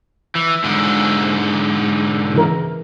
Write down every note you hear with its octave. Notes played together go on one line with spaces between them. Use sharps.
E3
G#2 D3
C#3 E3 A#4